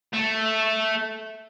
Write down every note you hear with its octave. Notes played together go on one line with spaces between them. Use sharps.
A3